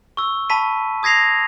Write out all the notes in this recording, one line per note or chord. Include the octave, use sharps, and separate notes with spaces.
C#6 E6
A5 B5 C#6 B6 D#7
D#6 G#6 A#6 C7 F7